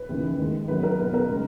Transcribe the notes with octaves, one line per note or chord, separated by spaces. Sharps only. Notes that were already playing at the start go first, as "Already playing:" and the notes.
Already playing: B4
D#2 C#3 E3
D#2 D#3 G#3
F#2 D#3 F#3 B4
A#4
E2 B2 F#3 B4
A#4
C#3 G#3